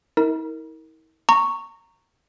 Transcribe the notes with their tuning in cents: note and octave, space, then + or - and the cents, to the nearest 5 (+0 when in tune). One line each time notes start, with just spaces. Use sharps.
E4 -45 A#4 -10
A#5 -20 C#6 +0